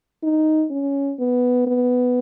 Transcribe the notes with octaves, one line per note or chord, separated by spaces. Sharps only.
D#4
C#4
B3
B3